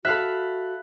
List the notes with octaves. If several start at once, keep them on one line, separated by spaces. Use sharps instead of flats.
F#4 A4 E5 F5 B5 F#6